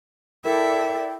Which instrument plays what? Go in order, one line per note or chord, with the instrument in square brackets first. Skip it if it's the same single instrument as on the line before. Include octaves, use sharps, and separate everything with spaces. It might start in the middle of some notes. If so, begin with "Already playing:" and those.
[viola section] E4 A4 D5 [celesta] A#4 [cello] E5 [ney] G5